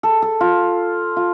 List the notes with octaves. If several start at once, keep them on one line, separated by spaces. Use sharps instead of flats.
A4
A4
F4
F4